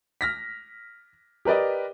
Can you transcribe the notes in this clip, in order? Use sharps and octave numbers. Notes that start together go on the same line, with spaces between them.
F6 A#6 B6
G4 A#4 B4 D5 D#5